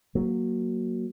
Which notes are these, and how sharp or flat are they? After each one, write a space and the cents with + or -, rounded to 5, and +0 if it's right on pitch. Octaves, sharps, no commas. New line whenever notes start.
F#3 +0 A#3 +0